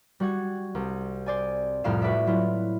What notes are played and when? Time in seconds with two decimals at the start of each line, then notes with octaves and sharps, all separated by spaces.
0.20 G3 F#4 F#5 G#6
0.75 C2
1.26 C5 D5 G#5
1.84 C2 F2 A2 G4 F5 E7
2.02 F#4 B4 D5 E5
2.26 F#3 E4 F4